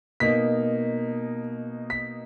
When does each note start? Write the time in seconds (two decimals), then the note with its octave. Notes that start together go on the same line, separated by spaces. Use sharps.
0.20 B2 A#3 D#4 B6
1.90 B6